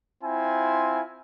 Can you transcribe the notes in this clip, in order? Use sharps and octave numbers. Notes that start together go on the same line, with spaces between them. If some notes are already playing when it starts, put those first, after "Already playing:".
C4 E4 F4 G#5